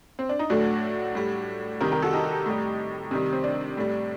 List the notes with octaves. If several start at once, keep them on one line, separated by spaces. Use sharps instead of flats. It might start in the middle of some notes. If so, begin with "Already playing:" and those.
C4
D4
D#4
A2 F#3 A3 D4 F#4
A2 G3
C3 D#3 G3 G4 A#4
G4 A#4
F#4 A4
D#4 G4
A2 G3
C3 D#3 G3
C4
D4
A2 G3